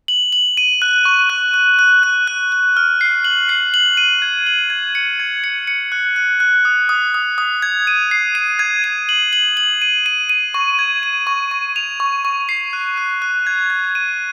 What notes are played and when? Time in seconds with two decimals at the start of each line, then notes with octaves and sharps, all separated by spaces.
0.08 F#7
0.33 F#7
0.57 D#7
0.82 F#6
1.05 C#6
1.30 F#6
1.54 F#6
1.79 F#6
2.03 F#6
2.28 F#6
2.52 F#6
2.77 F6
3.01 C7
3.25 F#7
3.49 C7
3.74 F#7
3.97 D#7
4.22 G#6
4.47 F#7
4.70 G#6
4.95 C#7
5.20 G#6
5.44 C#7
5.67 C#7
5.92 F#6
6.16 F#6
6.40 F#6
6.65 D#6
6.89 D#6
7.14 D#6
7.38 D#6
7.62 G#6
7.87 D#7
8.11 C7
8.35 D#7
8.59 G#6
8.84 D#7
9.09 F#7
9.33 F#7
9.57 F#7
9.82 D#7
10.06 D#7
10.29 D#7
10.54 C#6
10.79 G#6
11.03 D#7
11.27 C#6
11.51 C#6
11.76 F7
12.00 C#6
12.25 C#6
12.49 C7
12.73 F#6
12.98 F#6
13.22 F#6
13.47 G#6
13.70 G#6
13.95 D#7